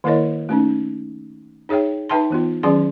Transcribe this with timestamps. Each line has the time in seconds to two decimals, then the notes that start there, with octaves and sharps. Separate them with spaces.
0.04 D#3 A#3 E4 A#4 C#5 D#5
0.49 A3 C#4 D#4
1.69 D#4 G#4 C#5 E5 G5
2.09 D#4 B4 E5 G5 A5 C6
2.30 E3 B3 F4
2.63 D#3 F#3 C#4 G#4 D5 C6